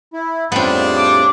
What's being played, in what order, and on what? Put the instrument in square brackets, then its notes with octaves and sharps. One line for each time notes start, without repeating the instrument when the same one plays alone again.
[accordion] E4
[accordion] F2 A2 C#3 [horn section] G3 D4 [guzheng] B3 C4
[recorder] D6